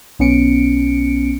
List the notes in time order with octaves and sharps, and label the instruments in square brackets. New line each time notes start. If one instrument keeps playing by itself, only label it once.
[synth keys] B1 B3 C#4 C#7 D7